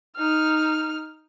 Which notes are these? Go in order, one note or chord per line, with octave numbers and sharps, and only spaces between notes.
D#4 F6